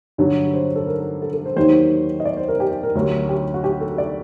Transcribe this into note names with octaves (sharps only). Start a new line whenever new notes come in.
G2 D3 F#3
C5
A4
A#4
A4
A4
C5
D#2 D#3 F#3 C5
D#5
D5
C5
A#4
G4
G4
A#4
D2 D3 F#3
G4
F#4
G4
A4
D5